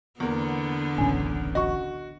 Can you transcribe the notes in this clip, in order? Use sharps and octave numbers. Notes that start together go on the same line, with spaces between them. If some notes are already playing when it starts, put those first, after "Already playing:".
E2 D3 A#3 B3
D1 A1 C#3 C#4 G#5
F#4 D#5 C#6